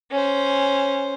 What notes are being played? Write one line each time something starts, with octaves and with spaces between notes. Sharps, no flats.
C#4 C5